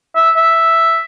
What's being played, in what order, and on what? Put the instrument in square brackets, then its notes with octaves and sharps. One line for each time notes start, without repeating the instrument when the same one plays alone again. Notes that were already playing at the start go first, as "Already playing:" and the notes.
[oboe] E5
E5